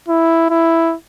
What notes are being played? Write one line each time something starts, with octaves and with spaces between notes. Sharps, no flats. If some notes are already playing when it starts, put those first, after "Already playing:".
E4
E4